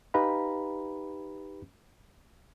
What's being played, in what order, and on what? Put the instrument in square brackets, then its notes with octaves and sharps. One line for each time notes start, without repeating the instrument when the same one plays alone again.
[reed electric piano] D#4 G4 B4 F5 A#5 B5